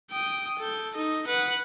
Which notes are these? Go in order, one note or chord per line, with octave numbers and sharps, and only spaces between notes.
G5 D#6
A4 G6
D#4 D#5
B4 F#5